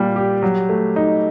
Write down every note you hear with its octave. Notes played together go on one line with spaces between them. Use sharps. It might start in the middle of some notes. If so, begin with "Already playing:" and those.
Already playing: A#2 G3
G4
F#3
A3
D#4